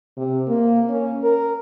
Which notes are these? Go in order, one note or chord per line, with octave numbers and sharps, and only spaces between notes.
C3
A#3
C#4
A#4